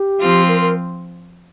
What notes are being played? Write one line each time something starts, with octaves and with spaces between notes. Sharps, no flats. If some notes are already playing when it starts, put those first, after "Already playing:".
Already playing: G4
F3 C4 F4
A#4
A#4